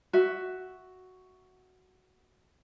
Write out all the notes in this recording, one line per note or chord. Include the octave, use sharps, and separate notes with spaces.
F#4 E5